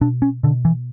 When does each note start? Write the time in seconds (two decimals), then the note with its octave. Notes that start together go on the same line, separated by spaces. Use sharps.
0.01 B2 D4
0.22 C#4
0.43 B2 D3
0.65 E3